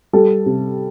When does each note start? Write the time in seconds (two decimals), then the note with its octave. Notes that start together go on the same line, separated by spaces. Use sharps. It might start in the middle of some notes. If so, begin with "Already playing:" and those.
0.13 G3 A4
0.46 C3